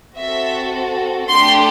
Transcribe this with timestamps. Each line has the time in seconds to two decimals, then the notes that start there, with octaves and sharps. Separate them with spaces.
0.18 C4 F#4 A4 E5
1.29 A3 D4 G4 C6